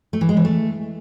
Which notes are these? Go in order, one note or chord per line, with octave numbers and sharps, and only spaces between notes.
A3
E3
G#3
E3
A3